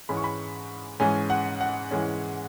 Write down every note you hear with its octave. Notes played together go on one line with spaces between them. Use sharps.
G#2 E3 G#3 C#4 B5
C#6
B5
G#2 E3 G#3 C#4 G#5
F#5
F#5
G#2 E3 G#3 C#4